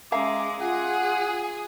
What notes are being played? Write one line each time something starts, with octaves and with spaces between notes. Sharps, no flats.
G#3 C#4 E5 F5 A#5 D6
F4 G#4 F#5